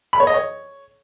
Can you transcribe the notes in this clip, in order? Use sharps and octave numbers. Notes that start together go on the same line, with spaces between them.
B5
C#5
D#5
C#5